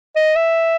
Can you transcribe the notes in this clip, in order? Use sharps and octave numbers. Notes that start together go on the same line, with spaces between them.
D#5
E5